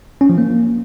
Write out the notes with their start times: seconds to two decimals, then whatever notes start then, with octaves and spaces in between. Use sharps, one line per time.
0.21 C#4
0.29 F3
0.38 A#3